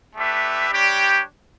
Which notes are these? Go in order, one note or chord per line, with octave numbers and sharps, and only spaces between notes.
A3 D4 G4 B4 E5
G3 D4 G4 C#5